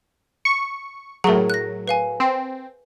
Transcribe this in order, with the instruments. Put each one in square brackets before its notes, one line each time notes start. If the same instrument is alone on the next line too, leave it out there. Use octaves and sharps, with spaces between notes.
[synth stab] C#6
[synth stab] A2 F#3 [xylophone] G#4 A#4
[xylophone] F#6 A#6
B4 F5 G#5
[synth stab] C4